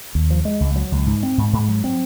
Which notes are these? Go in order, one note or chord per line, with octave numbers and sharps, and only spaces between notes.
D#2
F3
G#3
C#2
F#3
C#2
G#2
C4
G#2
G#2
F#3
C4